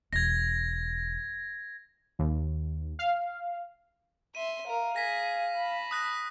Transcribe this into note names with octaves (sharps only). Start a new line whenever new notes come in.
E1 G#6 A#6
D#2
F5
E5 C6 D#7
A#4 F5
G#4 A#6 B6
A5 B5
D#6 F#6 A#6